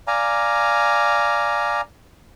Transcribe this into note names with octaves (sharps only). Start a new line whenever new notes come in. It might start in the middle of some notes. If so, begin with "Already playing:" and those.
D5 F5 G#5 A#5